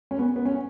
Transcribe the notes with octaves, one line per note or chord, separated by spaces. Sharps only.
C#4
B3
B3
C#4